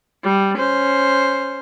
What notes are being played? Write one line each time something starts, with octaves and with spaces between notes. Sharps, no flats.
G3
C#4 C5